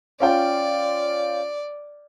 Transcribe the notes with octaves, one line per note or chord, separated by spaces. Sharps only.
C#4 F4 D5 G5